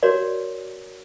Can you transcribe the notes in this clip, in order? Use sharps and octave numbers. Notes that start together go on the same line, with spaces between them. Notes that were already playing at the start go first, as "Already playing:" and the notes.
F#4 A#4 C#5 D5